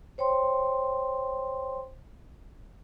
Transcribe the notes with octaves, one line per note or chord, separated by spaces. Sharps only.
C5 C#5 G5 C6